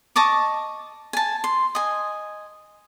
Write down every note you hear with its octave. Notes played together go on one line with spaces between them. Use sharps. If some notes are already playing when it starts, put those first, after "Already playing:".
D#5 A5 C#6 D6
G#5 A5
C6
D#5 G#5